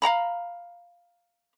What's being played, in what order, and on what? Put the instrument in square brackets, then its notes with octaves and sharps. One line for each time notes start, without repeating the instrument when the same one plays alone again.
[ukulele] F5 F#5 A#5 B5